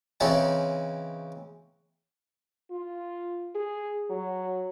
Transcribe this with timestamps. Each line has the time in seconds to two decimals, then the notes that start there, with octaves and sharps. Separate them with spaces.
0.20 C#3 E3 C4 C#4 D#4
2.71 F4
3.55 G#4
4.10 F#3